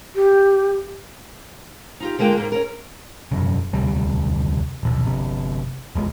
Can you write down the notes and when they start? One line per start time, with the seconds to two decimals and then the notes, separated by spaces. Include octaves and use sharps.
0.15 G4
2.00 D#4 F4 G4
2.19 D3 G#3 A#3 F4 G5
2.37 G#2 A#3
2.52 C#4 A#4
3.31 E1 F#2 C#3
3.73 E1 D2 C3 G3
4.83 D#1 B1
5.04 G1 C3
5.95 E1 B1 G#3